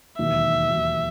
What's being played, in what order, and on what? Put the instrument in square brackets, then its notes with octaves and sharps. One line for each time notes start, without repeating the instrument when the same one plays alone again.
[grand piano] E1 D#2 D#3 F#3 [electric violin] E5
[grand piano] E1 D#2 D#3 F#3